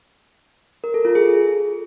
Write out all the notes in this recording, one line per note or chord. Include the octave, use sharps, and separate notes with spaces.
A#4
A4
F4
G#4